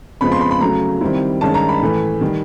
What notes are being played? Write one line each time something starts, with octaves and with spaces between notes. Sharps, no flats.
F2 C#3 F3 G#3 B3 B5
C6
B5
B5
C#3 F#3 A3 A#5
D#3 G3 C4 E4
G2 D#3 G#3 C#4 A5
A#5
B5
A2 E3 A3
D#3 G3